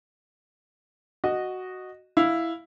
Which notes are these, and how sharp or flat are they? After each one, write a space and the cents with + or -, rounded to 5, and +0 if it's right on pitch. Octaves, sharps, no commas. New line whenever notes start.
F#4 +0 D#5 -10
E4 +0 F5 +0